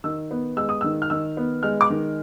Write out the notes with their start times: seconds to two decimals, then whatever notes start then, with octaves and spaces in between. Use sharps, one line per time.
0.04 D#3 E6
0.31 B3
0.57 G#3 E6
0.69 D#6
0.81 D#3 E6
1.02 F6
1.10 D#3 E6
1.37 B3
1.63 G#3 F6
1.81 D6
1.90 D#3